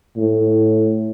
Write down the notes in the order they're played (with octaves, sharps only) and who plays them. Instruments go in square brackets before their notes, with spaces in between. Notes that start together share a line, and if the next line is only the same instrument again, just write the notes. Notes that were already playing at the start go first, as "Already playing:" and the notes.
[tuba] A2